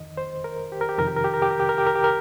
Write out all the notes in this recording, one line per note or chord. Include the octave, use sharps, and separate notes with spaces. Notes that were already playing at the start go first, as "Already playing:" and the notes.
Already playing: F2 D#3 D#5
C5
A#4
G4
A#4
G4
F2 C3 D#3 A#4
G4
A#4
G4
A#4
G4
A#4
G4
A#4
G4
A#4
G4
A#4